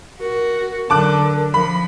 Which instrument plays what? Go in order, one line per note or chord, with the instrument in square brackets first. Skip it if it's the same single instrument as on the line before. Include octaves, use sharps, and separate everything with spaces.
[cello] F#4 [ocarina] A#4
[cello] D3 F#3 [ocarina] A#4 [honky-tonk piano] A5 D6 F#6
[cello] F3 [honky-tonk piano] B5